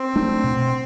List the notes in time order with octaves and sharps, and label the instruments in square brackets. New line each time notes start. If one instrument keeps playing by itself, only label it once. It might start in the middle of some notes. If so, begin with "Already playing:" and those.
Already playing: [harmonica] C4
[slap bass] F#3 A3 D4
B2